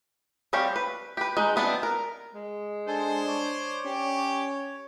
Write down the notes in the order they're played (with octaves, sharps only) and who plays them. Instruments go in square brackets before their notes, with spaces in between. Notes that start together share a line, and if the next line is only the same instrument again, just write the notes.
[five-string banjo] G3 C4 G4 C#5 F5
B4
G4 B4
G#3 D#4
E3 B3 C4 D4
A#4
[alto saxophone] G#3
[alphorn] D4 [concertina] A4 G#5 [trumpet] C5
[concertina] C#5 [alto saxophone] D5
[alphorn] C#4 [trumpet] G4